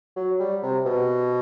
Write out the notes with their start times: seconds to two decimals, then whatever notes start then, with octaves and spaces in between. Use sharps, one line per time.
0.16 F#3
0.40 G3
0.63 C3
0.86 B2